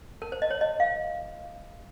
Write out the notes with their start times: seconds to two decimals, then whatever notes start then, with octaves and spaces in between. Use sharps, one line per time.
0.22 A#4
0.32 C5
0.42 D#5
0.50 C#5
0.61 D#5
0.80 F5